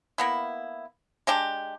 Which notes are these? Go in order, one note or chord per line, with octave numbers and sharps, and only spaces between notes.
A#3 B3 E4
G#3 D4 G4